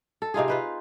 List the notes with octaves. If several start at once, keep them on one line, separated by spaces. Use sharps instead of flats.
A4
C3 D#4 F4 G#4
F4 B4 C5